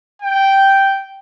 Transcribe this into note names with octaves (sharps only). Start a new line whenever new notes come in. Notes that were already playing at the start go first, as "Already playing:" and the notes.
G5